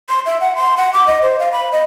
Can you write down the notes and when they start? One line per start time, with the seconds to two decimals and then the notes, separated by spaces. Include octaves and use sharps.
0.09 C6
0.26 E5
0.41 F#5
0.56 C6
0.77 F#5
0.93 D6
1.07 D#5
1.22 C5
1.39 F5
1.52 B5
1.72 D#5